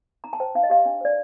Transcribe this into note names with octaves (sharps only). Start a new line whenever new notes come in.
D#4 A#5
A5
C5 G5
D#4 F5
D#5
G4 F5
D4
C5 D5